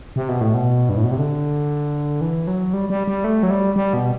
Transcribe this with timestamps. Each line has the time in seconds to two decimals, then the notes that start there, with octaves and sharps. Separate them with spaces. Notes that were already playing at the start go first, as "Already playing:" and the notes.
0.16 C3
0.29 B2
0.41 A2
0.54 B2
0.89 G2
0.97 A2
1.04 B2
1.11 C3
1.19 D3
2.21 E3
2.47 F#3
2.73 G3
2.90 G3
3.07 G3
3.24 A3
3.43 F#3
3.50 G3
3.76 G3
3.94 B2